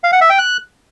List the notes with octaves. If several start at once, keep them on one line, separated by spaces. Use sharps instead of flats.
F5
F#5
E5
G5
F#6